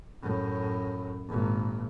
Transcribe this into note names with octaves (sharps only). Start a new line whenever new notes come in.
F#2 A2
G#1 A#2